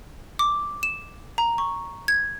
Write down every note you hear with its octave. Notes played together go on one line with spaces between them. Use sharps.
D6
E7
A#5
C#6
G#6